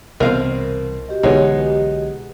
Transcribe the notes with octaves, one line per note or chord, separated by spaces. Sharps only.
C2 B2 E3 C4 A#4 F5
F#4 G4 D#5
B1 D3 E3 G#3 B3 D#4 C#5